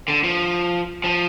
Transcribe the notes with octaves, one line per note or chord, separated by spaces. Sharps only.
D3
F3
F3